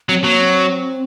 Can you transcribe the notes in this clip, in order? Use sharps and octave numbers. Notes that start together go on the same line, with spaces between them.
F#3 C4
F#3 A#3
C4